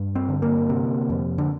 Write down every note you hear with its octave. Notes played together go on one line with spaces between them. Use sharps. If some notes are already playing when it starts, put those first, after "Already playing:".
Already playing: G2
C4
D3
A#3
C3
F2
D3